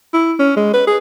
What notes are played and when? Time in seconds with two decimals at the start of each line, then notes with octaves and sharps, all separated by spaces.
0.13 E4
0.39 C#4
0.56 G#3
0.74 B4
0.87 G#4